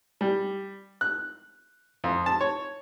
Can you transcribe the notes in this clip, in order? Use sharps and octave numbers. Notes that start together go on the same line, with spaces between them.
G3
F#6
F2
A5
C#5